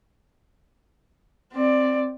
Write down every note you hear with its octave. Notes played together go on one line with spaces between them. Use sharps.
C4 D5